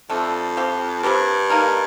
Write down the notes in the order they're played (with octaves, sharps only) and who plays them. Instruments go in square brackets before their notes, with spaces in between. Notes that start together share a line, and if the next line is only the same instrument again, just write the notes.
[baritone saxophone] F2 [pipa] D3 F3 A3
[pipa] F3 C4 G4
[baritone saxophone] G2 [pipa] G3 C4 G4 A#4
[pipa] A#3 D#4 A#4